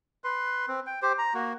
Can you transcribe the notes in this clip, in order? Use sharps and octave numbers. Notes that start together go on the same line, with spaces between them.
B4 C6
C4
G5
G4 C5
A#5
A#3 F#4